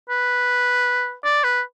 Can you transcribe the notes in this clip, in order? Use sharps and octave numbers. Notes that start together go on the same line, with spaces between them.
B4
D5
B4